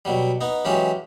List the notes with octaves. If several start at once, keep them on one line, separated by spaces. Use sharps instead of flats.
B2 F#3 G3
B3 D#4
E3 F#3 G#3 C#4 G4